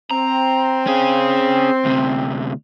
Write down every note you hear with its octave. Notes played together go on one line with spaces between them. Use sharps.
C4 A#5
C#4 G#4
D2 C3